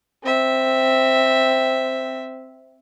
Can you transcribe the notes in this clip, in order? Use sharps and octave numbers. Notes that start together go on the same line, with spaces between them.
C4 E5